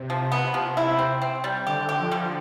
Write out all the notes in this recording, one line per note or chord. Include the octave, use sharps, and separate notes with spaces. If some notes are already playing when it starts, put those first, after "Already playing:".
Already playing: C3
F3
B3
F3
E4
C4
C4
G3
D3 G4
G4
F3
G3